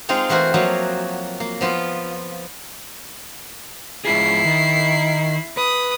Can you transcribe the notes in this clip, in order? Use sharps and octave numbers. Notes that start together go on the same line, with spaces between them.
G#3 C4 D#4 F4 G5
E3 A3 F#4 A#4 C5
F3 F#3 A#3 F#4
A#3
F3 B3 F4
G#2 E4 F4 G#4 C7
D#3
B4 D#6